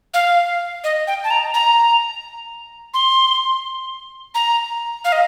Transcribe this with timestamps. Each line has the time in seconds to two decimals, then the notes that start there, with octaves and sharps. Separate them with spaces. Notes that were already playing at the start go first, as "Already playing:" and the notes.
0.14 F5
0.84 D#5
1.07 G5
1.24 A5
1.30 A#5
1.54 A#5
2.94 C6
4.35 A#5
5.04 F5
5.12 D#5